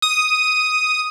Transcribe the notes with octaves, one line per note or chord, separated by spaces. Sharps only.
D#6